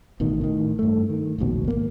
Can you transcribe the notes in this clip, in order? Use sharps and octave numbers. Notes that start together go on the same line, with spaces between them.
A1 B2 D#3
A2 D#3
G2 A3
D#3
F1 A#1 D#2 B2
G#1 F2 A#3